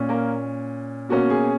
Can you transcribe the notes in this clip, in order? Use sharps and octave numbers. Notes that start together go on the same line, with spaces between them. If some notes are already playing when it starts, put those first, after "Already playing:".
Already playing: A#2 C#4
A#3 A#4
B2 A#3 C#4 F#4
G#4